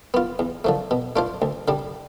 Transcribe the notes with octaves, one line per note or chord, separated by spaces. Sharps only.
B3 F4
E2
D3 F3 A3
B2
A3 D4 F4 C5
D2
D3 G3 D4